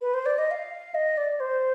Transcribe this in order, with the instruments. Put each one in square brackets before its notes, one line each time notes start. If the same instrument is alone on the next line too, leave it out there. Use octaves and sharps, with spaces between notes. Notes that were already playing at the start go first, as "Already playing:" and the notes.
[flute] B4
C5
D5
D#5
F5
D#5
D5
C5